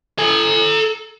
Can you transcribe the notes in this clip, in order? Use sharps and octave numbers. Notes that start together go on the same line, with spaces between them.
A4 G#5